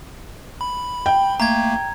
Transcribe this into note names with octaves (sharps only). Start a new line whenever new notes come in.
B5
G5
A3 A#3 A#5 G#6